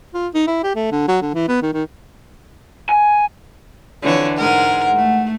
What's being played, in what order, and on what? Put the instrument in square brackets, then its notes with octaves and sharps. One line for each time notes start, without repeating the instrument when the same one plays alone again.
[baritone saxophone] F4
D#4
E4
G4
A3
D3
F#3
D3
E3
B3
D#3
D#3
[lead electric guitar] G#5
[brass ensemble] F2 [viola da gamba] D3 E3 C#5
[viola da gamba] G#2 G#3 A#4 [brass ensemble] F#5
[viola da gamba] A3